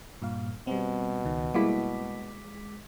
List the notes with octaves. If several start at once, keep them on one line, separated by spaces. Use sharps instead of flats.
G2 A#2 F5
B2 G3 C4
C#2 D#3
G3 G#3 A#3 E4 D6 B6